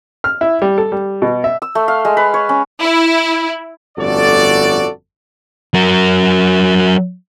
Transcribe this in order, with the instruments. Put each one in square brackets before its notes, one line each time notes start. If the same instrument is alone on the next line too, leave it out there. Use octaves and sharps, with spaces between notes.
[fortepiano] F6
E4
G3
A4
G3
B2
E5
[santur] E6
A3
F5
G#3
B4
C#5
C#4
[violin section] E4
[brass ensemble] G1 F2 A2 F#4 A4 D5
[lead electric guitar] F#3 A#4